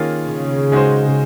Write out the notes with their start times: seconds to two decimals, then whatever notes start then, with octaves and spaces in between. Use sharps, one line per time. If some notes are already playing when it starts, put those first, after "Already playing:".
Already playing: D#3 A#3 C#4 F4 G#4
0.27 C#3
0.72 G#3 D#4 F#4 C5